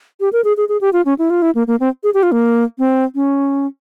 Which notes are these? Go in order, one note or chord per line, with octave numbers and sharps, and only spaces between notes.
G4
A#4
G#4
G#4
G#4
G4
F4
C#4
E4
F4
E4
A#3
A#3
C4
G#4
G4
F4
A#3
C4
C#4